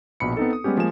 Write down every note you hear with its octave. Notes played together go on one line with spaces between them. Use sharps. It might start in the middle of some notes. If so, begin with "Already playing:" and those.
A#1 B2 B5 C#7
B3 C4 D#4 A4
D#6
G3 G#3 B3 C#4 G4
F3 G#3 A#3 G#5 E7